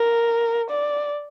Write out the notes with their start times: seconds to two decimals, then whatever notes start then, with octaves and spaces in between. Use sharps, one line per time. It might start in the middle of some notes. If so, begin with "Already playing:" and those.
Already playing: A#4
0.70 D5